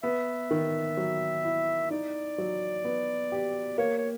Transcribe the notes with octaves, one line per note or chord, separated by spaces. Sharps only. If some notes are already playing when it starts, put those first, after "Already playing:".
B3 E5
D#3
F#3
E4
D#4 D5
F#3
B3
G4
A#3 C#5
C#5